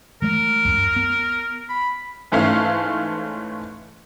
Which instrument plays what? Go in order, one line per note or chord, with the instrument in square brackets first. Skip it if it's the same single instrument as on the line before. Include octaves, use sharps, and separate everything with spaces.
[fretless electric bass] E3 G#3 A3 [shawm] A#4
[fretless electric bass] C#2 F#2
B3
[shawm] B5
[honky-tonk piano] G#2 E3 A3 C#4 F5